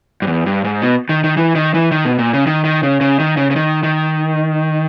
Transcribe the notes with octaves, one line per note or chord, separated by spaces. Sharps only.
G2
E2
G2
G#2
B2
D#3
D#3
E3
D#3
E3
D#3
B2
A#2
C#3
D#3
D#3
C#3
C#3
D#3
C#3
C#3
D#3
D#3